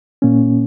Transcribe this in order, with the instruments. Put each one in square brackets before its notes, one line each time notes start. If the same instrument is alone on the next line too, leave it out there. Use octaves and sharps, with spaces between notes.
[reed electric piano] A#2 A#3 C#4